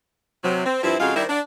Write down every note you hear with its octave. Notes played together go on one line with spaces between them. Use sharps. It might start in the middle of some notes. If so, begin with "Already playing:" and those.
C3 F#3
C4
G2 F3 C4 E4
F2 C#3 G#3 F4 F#4 F5
D#3 G3 D4 E4 C5
D4